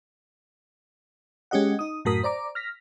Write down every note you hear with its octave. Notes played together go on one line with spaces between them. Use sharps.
G#3 C#4 G4 D#5 F#5
D#4 D#6
F#2 A2 F#4 A#4 D#6 B6
C5 D5 A#5 D6
F6 A#6 B6